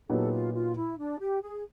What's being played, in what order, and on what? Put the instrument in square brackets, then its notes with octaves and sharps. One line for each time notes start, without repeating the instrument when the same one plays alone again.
[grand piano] A#2 F#3 B3 D#4 G4 [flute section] A4
[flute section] F4
F4
E4
D4
G4
G#4